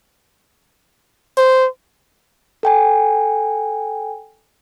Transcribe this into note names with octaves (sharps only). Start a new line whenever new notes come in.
C5
A4 G5 G#5